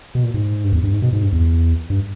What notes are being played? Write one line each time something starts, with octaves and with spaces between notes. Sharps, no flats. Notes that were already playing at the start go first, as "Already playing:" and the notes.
B2
A#2
G#2
G2
E2
G2
G#2
B2
G#2
G2
E2
G2